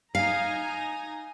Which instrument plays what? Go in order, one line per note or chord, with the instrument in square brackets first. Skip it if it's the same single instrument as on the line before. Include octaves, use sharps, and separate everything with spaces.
[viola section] D#4 G#5 A#5 [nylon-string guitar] F5